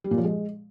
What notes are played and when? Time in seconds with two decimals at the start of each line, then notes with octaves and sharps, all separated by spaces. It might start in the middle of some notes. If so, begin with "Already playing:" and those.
0.04 G3
0.11 A#2
0.18 F3
0.25 G#3